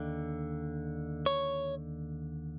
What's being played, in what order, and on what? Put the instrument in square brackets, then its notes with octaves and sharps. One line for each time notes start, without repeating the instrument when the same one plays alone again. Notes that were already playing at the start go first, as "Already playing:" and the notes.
Already playing: [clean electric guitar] D#2 D3
C#5